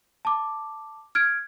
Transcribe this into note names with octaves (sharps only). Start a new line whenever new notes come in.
A5 D6
F6 G#6 D7